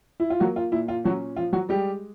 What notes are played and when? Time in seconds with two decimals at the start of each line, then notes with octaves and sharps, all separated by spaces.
0.20 E4
0.30 F4
0.40 F#3 A#3 F#4
0.56 F4
0.72 A#2 E4
0.88 F4
1.04 F#3 C#4 F#4
1.36 F3 F4
1.53 F#3 F#4
1.69 G3 G#3 G4